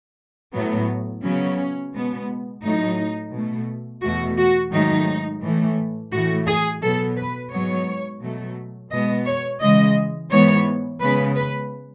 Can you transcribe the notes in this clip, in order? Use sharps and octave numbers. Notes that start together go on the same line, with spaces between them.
A2 F#3 B3
C#3 F#3 B3 C#4
B2 G#3 B3
A2 F#3 A3 D#4
B2 A3
E2 B2 A3 F#4
F#4
G#2 D#3 F#3 A3 D#4
A2 E3 A3
A2 E3 A3 F#4
G#4
B2 F#3 B3 A4
B4
G#2 F#3 B3 C#5
B2 F#3 A3
B2 G#3 B3 D#5
C#5
C#3 E3 G#3 D#5
G#2 E3 G#3 B3 C#5
C#3 G#3 B3 B4
B4